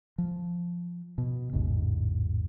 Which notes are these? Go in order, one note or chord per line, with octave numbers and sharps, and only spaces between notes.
F3
B2
A1 E2 G#2 C#3